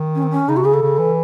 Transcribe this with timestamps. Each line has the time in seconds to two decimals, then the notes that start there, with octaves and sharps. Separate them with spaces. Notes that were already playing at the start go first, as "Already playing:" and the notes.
Already playing: D#3
0.15 C#4
0.23 C4
0.31 C#4
0.48 C#3 D#4
0.56 C3 F#4
0.63 C#3 G#4
0.74 A4
0.82 C#3
0.99 E3